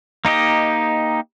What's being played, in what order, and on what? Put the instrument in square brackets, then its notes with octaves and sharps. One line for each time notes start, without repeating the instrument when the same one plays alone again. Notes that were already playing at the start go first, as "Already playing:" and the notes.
[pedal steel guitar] A#3 D#4 G4 D#5